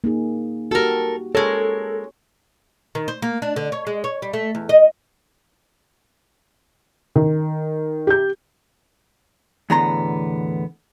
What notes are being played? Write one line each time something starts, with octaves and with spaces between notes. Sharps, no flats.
A#3 D#4 G#4
F#4 G4 A4 A#4
G#3 A4 A#4 C#5
D#3
C5
A#3
D4
D3
C#5
G#3
C#5
G3
A3
E2
D#5
D#3
G4 G6
E2 A2 D3 B3 A#5 C6